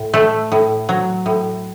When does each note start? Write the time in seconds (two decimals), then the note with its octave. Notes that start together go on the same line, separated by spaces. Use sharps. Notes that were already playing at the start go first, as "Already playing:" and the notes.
Already playing: A2
0.14 A3
0.52 A2
0.89 F#3
1.26 A2